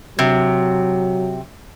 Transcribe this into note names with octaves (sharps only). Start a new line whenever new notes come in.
C3 F#3